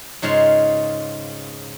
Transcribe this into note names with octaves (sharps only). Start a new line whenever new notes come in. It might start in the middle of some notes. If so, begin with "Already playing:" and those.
G#2 C#3 G#3 F4 F5